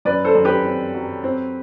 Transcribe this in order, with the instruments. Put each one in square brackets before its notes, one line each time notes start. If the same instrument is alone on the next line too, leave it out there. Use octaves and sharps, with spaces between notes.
[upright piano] F#2 B4 D5
A4 C5
F#2
G4 B4
C4
F#3
C4